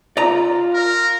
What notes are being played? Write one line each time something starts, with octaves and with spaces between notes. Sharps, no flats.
F4 D5 A#5
A#4